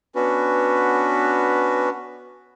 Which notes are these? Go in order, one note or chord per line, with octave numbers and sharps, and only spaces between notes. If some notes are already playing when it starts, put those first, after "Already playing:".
B3 C#4 D4 F#4 B4